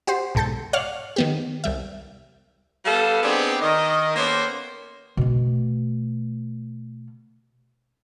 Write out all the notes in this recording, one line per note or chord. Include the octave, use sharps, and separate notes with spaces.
F#4 G4 C5
B1 G#2 A4 G6 A6
C#5 D5 F5 F#5 F6 F#6
D#3 B3 G4
C2 G3 E5
G3 B3 A4 F5
B3 C4 D4 D#4 G4 G#4
D#3 D#5
A#3 B3 C#4 G4 A4 C5
B2 A3